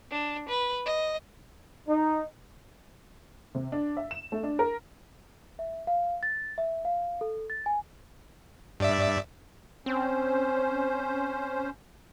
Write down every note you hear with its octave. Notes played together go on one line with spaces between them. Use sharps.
D4
B4
D#5
D#4
C3
D4
E5
E7
A3
D4
A#4
E5
F5
A6
E5
F5
A4
A6
G#5
G2 D5 E5
C4 C#4 C5